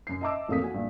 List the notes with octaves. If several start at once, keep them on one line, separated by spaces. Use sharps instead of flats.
F#2 C7
D#5 E5 A5 A#5 D6 E6
A1 F2 A#3 A4 D#6 B6
F#4 G#5
A#1 G2